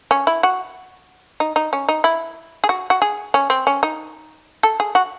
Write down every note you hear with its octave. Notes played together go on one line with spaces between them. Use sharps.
C#4
E4
F#4
D#4
D#4
C#4
D#4
E4
G#4
F#4
F#4
G#4
C#4
C4
C#4
D#4
A4
G#4
F#4